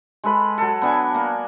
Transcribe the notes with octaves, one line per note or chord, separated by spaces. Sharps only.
G#3 A4 B4 B5
F#3 A4
B3 D4 G#5
A#3